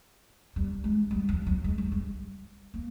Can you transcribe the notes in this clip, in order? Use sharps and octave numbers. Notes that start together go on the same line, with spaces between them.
G3
G#3
G3
F3
F#3
G#3
G3
G#3
A#3